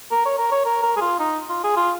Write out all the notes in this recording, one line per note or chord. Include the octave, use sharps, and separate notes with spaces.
A#4
C#5
A#4
C#5
A#4
A#4
G#4
F4
D#4
F4
G#4
F4